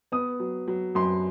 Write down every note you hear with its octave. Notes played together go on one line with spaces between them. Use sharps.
B3 D#6
F#3
F#3
F#2 C6